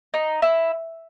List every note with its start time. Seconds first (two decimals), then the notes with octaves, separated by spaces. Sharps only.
0.14 D#4
0.42 E4